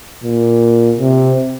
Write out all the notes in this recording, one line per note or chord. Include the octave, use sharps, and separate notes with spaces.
A#2
C3